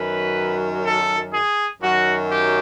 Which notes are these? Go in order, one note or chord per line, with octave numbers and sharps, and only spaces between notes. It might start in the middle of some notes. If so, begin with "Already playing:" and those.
Already playing: F#2 D#3 F#3 B4
A4
G#4
F#2 D#3 F#3 F#4
G4